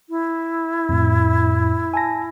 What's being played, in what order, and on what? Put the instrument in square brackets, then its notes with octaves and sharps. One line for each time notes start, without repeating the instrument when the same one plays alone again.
[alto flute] E4
[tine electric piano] F2 A2
G#5 A5 A#6